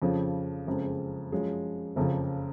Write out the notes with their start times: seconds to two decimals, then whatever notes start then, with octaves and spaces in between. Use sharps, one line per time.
0.02 F2 C#3 F3
0.67 F#1 F2 C#3 G#3
1.32 F#2 F3 G#3
1.96 F#1 F2 C#3 F3